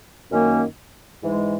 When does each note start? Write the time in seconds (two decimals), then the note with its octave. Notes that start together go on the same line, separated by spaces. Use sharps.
0.31 F#2 D#3 A#3 C#4
1.23 G#2 E3 G#3